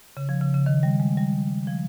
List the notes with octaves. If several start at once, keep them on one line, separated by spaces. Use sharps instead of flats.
C#3
F3
C#3
C#3
D#3
G3
G#3
G3
F3